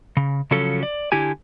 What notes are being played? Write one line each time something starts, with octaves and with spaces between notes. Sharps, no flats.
C#3
C#3 F3 F#3 C#4 A4
D5
D3 E4 G4 G#5